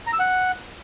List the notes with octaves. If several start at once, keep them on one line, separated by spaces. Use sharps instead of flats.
A#5
E6
F#5